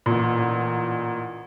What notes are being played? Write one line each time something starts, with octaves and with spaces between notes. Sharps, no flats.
A1 A#2